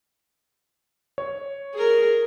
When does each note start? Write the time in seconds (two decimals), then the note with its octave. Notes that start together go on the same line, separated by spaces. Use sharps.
1.18 C#5
1.74 G#4 A#4